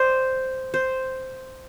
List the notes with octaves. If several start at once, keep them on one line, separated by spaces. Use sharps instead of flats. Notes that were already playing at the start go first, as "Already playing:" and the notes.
Already playing: C5 D5
C5